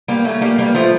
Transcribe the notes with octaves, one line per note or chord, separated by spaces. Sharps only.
G3 A#3
A3 C#4
G3 A#3
G3 A#3
F3 A3